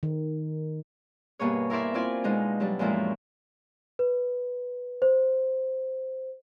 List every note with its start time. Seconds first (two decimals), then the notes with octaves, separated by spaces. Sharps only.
0.03 D#3
1.39 G2 B2 A#3 G#4 C#5
1.70 E4 A#4 C5 D5 E5
1.94 C4 E4 F4 D5 G#5
2.24 B2 G#3 D4 D#4
2.60 F#3 G3 D4
2.79 F#2 A#2 F3 G#3 D4 E4
3.99 B4
5.02 C5